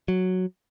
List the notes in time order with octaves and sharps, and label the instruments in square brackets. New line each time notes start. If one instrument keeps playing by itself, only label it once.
[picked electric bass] F#3